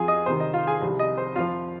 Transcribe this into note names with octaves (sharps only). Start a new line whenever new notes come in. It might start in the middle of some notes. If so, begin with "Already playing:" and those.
Already playing: F2 F3 F4 G#4 G#5
D#5 D#6
C2 C3 D#3 C5
D#5
F4 F5
G#4 G#5
C2 C3 F3
D#5
C5
F2 F3 F4 F5